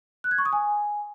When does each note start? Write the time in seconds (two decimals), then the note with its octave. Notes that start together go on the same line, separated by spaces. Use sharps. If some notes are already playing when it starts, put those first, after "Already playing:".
0.24 F#6
0.31 G#6
0.38 C#6
0.45 D#6
0.53 G#5